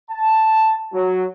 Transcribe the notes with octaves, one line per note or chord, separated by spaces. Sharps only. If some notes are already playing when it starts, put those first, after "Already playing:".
A5
F#3